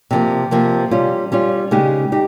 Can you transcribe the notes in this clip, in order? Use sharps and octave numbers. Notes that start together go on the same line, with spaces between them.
C3 F3 A#3
C3 F3 A#3
G3 C#4 F4
G3 C#4 F4
C#3 G#3 D#4 G4
D#4 G4